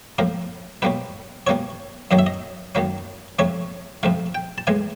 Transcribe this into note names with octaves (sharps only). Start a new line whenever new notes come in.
A2 F3 A#3 A#4
B2 G3 A#3 C#4 B4
B2 G3 A#3 C#4 C#5
F#2 D#3 F#3 A#3 C#4 D#5
E5
D#5
F#2 D#3 F#3 A#3 C#4
F2 C3 F3 A3 C#5
F2 C3 F3 A3 F5
G5
A5
A2 E3 G#3 G#5